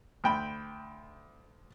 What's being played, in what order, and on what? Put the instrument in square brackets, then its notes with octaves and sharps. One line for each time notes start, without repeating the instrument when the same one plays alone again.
[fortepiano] D2 G5 B5